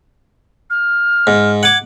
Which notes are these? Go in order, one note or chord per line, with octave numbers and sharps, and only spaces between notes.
F6
G#2
F#5 D6 G#6